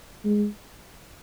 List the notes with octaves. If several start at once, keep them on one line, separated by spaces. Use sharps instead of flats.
G#3